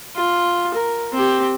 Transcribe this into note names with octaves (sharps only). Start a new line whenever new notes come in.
F4
A#4
C4 G4